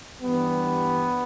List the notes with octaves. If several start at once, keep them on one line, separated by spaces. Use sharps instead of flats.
G2 E3 G3 B3